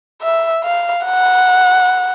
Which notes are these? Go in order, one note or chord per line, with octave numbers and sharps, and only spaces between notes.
E5
F5
F#5